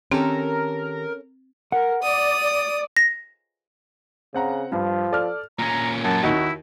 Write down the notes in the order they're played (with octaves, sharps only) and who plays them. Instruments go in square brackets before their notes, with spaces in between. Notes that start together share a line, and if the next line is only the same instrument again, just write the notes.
[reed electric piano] D#3 G4 [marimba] C4 [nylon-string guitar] C#4 A4 [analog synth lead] A#4
[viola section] A#4 [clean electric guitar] F#5
[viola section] D5 [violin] D#6
[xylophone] A#6
[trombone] C#3 [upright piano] C4 F#5 A#5
[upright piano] G2 [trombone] F3
[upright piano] A4 D5 F6
[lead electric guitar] A#2 C#4 [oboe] A#5
[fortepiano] F#2 [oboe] A5
[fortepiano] D#2 D#4 F#4 [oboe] E4